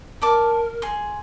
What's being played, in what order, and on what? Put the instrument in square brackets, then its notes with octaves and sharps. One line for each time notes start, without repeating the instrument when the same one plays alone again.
[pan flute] A#4 [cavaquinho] D5 A5 D6
[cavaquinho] G#4 C6